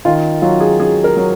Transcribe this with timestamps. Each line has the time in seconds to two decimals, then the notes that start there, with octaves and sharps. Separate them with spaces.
0.05 D#3 F4
0.42 F#3 F4
0.60 G#4
0.80 F#3 G#4
1.04 A#4
1.17 F#3